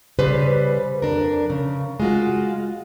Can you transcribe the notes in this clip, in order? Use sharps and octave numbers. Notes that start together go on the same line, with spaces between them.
C#3 G3 B4 C5
F2 D4 A#4
C#3
G#3 F4 F#4